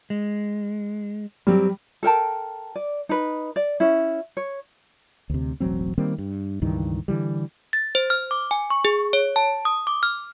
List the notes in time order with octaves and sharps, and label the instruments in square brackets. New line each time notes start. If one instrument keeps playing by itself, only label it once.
[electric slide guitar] G#3
[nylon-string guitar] F#3 C4 G4 [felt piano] G3
[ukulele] A4 A#4 G5 A5
D5
D#4 B4
D5
C#4 E4
C#5
[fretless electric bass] D2 C3
E1 A1 F#3 C4
D#3 G3 A#3 C4
G2
C#2 G2 D#3 E3
D3 E3 G3
[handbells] A6
C5
F6
D6
G#5
C#6
G#4
C#5
A5
D#6
D6
F6